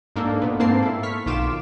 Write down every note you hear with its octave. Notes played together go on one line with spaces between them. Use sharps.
G#2 A#3 D4 A4
A#2 B3
G#2 A#3 C4 A5 C7
E4 A4
C#6 F6 B6
B1 D#3 F4 D6 E7